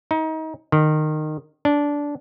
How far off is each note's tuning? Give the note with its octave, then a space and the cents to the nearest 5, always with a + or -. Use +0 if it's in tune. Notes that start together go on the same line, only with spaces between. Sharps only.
D#4 +30
D#3 -20
D4 -15